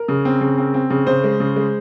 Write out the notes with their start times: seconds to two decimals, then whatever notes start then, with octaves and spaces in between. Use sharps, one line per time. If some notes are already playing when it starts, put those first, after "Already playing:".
Already playing: A#4
0.08 C#3
0.25 C4
0.41 C#3
0.58 C4
0.74 C4
0.90 C#3
1.07 C#3 C5
1.24 G#3
1.40 C#3
1.56 G#3